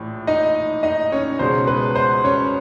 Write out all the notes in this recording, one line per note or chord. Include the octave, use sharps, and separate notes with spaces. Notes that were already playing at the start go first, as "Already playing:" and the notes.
Already playing: A#1 A2 E3
D#4 D#5
D#4 D#5
C#4 C#5
C#2 B2 G#3 C#4 C5
B4
C5
C#4 C#5